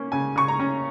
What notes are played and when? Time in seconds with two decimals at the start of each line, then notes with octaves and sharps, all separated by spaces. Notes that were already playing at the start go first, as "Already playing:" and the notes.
Already playing: A#3 C#4
0.12 C#3 G#5
0.36 C#3 C#6
0.48 A#5
0.60 C#4